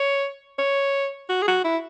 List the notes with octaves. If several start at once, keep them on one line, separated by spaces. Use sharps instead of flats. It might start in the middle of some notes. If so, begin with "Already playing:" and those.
Already playing: C#5
C#5
F#4
G#4
F#4
E4